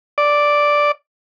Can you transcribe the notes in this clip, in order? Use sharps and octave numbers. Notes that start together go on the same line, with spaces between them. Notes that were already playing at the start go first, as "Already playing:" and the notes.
D5